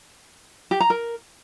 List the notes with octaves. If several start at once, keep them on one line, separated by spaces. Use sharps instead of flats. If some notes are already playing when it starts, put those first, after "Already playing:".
G4
A#5
A#4